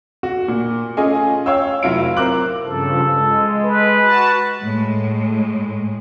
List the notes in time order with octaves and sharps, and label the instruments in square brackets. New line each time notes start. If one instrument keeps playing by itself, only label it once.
[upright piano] F#4
A#2
A3 C#4 F4 G#4 D#5 G#5
C#5 F5 G5 E6
F1 F#3 E4 F4 F5 D7
C4 A#4 C5 D6 F#6 F#7
[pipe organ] G2 C#3 F3 [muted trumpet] A4
[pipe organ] G#3
[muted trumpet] B4
[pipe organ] F#4 A5
[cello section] A2 G#3